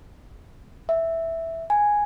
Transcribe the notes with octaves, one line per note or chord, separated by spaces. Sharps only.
E5
G#5